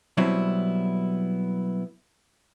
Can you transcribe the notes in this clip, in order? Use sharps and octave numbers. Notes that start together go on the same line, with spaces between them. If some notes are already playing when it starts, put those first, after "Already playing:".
B2 F#3 G3 B3 C4 E4